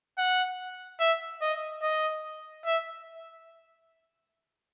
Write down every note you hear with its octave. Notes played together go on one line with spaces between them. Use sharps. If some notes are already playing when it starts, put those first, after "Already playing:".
F#5
E5
D#5
D#5
E5